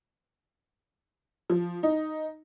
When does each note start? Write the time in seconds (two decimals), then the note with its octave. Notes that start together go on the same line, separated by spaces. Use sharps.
1.50 F3
1.83 D#4